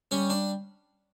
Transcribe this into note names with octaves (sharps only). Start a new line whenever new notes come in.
G3 C#4
D4